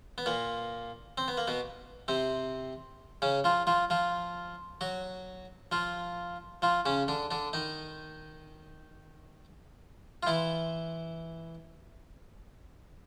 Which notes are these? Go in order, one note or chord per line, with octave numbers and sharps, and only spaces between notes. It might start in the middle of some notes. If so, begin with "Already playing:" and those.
B3
A#2 A#3
C4
B3
A#3
B2 B3
C3 C4
C#3 C#4
F3 F4
F3 F4
F3 F4
F#3 F#4
F3 F4
F3 F4
C#3 C#4
D3 D4
D3 D4
D#3 D#4
F4
E3 E4